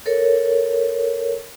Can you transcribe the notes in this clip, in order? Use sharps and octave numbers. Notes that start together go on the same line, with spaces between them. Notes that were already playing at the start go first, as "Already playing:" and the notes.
A4 A#4 C#5